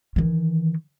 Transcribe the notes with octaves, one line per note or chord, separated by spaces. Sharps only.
D#3 E3